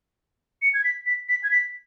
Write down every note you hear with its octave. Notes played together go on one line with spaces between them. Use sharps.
C#7
G#6
B6
B6
B6
G#6
B6